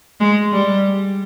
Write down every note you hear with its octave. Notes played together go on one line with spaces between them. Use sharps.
G#3
G3